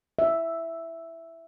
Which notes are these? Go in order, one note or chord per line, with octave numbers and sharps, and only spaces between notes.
E5